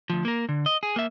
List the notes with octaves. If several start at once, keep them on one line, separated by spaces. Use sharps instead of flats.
D2 F3
A#3 A#4
D3
D#5
G#4
A#3 E5